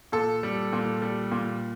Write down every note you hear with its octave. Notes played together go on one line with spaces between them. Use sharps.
A#2 A4
G3
A#2
G3
A#2